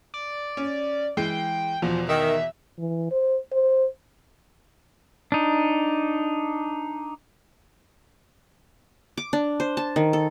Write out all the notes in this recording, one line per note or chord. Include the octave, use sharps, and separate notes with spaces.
D5
C#4
E3 G#3 G5 C7
E2 B2 F3
D#3 E5
E3
C5
C5
D4 D#4
D6
D4
C5
A5
D#3
A4